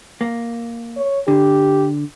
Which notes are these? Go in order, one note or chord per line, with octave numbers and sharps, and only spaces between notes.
A#3
C#5
D3 G4